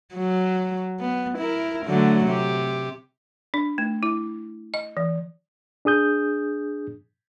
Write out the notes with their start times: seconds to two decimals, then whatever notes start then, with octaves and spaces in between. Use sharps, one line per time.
0.15 F#3
1.01 B3
1.38 E4 A#4
1.87 D3 F#3 A3
2.26 C3 G4
3.54 D4
3.78 A3
4.03 E4
4.74 D#5
4.97 E3
5.85 D4 G#4 D#6 G6